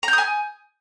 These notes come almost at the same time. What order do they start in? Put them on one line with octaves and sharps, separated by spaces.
A#5 G6 D#6 G#5